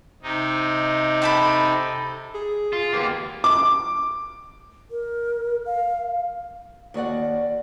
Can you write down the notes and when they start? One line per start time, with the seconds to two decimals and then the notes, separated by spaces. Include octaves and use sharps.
0.22 C3 D#4
1.22 G4 A4 B5
2.35 G#4
2.73 F4
2.93 A#3 B3 G4
3.44 D6
4.91 A#4
5.66 F5
6.94 D#2 F#4 D5 F#5